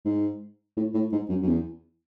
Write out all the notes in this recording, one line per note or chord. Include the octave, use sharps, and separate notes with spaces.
G#2
A2
A2
G#2
F#2
F#2
E2